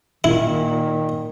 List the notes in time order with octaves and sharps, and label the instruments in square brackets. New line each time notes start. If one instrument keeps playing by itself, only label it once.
[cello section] A#2 [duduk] D#3 [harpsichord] E4